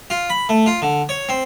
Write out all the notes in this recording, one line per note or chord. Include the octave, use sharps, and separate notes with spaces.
F4
B5
A3
F4
D3
C#5
C4